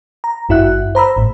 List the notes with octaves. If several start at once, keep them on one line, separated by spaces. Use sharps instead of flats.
A#5
G#1 G2 E4 F#4 E5 F#6
C5 A#5 B5 E6
G#1 A2